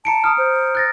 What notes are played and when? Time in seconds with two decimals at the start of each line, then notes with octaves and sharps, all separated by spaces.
0.05 A5 A#5 C#7 D7
0.24 A#5 D#6 F6
0.38 C5
0.75 F#6 A6 A#6